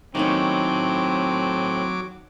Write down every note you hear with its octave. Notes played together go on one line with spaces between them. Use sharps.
A2 D#3 F#3 A#3 C4 C#4 D6